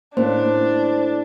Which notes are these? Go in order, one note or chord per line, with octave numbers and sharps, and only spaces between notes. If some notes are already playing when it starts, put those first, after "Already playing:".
A2 A3 A#3 C#4 D4 C5